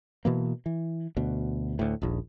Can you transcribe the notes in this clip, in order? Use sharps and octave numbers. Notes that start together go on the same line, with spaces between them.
B2 E3 A#3
E3
D2 B2
D2 A2
D#1 A#1